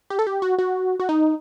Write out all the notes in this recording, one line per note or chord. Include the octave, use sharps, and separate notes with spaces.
G4
A4
G4
F#4
F#4
F#4
D#4